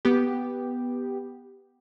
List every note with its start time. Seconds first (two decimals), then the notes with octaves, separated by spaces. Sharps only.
0.05 B3 G4